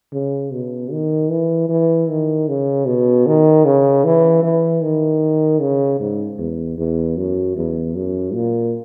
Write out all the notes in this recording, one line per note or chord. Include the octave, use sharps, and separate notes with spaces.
C#3
B2
D#3
E3
E3
D#3
C#3
B2
D#3
C#3
E3
E3
D#3
C#3
G#2
E2
E2
F#2
E2
F#2
A#2